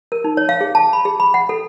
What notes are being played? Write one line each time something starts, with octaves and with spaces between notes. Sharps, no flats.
A#4
D#4
C#5
F5
G#4
A5
B5
G#4
B5
F#5
A4